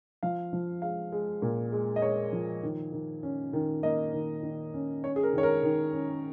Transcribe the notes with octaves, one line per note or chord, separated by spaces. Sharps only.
F3 F5
F3
G#3 F5
G#3
A#2
G#3
D#5
G#3 C#5
F3
D#3
D#3
C#4
D#3
A#3 D#5
D#3
D#3
C#4
C#4 C#5
G#4
A#4
D#3 C#5
A#4
D#3
C#4